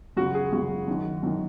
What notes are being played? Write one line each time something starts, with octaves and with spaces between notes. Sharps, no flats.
F#2 C#3 F#4
G#4
F#2 C#3 F#4
F#2 D#3
F#2 D#3